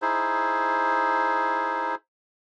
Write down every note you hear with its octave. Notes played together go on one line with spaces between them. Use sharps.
D#4 E4 G#4 C5